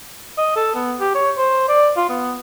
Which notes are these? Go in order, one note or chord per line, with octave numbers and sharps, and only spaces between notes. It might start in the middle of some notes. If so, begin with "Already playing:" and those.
D#5
A4
B3
G4
C#5
C5
D5
F4
B3